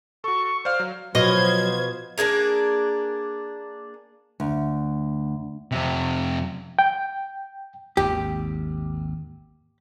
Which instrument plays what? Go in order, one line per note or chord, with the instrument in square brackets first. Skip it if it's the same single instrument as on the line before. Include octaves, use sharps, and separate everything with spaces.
[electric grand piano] F#4 A4 [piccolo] C#6
[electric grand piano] C5 D5 F5 [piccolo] F6
[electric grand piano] F#3
[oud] B2 F3 [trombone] F#3 [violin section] C5 G#6 [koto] D#5
[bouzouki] A#3 D4 G#4 A#4
[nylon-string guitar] D2
[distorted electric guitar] F2 C3
[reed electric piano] G5
[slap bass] G#1 D#2 [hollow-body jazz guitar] G4